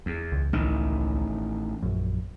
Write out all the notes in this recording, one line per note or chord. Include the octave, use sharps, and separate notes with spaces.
E2
C#2
A1 D#3
A#1 F#2